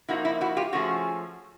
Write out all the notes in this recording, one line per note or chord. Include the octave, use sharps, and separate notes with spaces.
F3 A#3 D#4 E4 F#4
E4
E4 F#4
F4 G4
F3 A3 C#4 F#4 G#4